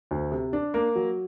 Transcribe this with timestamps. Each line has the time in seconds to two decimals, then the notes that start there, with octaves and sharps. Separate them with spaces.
0.11 D2
0.32 C3
0.53 D4
0.74 A#3
0.95 F#3